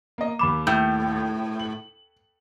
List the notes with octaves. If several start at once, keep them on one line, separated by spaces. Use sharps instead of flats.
A#3 D#5
D#2 B5 D6 E7
A2 G6
F#7